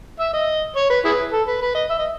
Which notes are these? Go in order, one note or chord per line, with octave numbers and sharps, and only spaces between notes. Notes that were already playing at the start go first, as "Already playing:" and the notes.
E5
D#5
C#5
B4
E4 G#4 B4
A4
B4
B4
D#5
E5
D#5